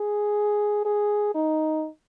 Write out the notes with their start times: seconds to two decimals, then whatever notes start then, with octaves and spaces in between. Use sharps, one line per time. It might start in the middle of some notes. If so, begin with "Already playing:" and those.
Already playing: G#4
0.85 G#4
1.35 D#4